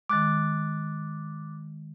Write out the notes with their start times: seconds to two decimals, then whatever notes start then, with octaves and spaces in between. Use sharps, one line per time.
0.10 D#3 G#3 D6 F#6 A6